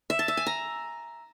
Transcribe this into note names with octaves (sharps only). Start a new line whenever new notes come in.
E5
A5
E5
G#5
A#5